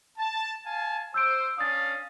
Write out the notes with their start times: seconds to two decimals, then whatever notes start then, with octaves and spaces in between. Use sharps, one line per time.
0.18 A5
0.65 F5 G#5 A5
1.14 C5 E6 G6 D7
1.58 C#4 D4 F5 D#6 A6